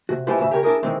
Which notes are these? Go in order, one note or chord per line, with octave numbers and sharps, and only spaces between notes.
C3 F#4
G#3 E4 F4 G4 B4 C5
D2 G#2 C#3 E5 B5
C#3 G4 A#4 C#5
D4 E4 G#4 A#4
D#3 E3 G#3 C4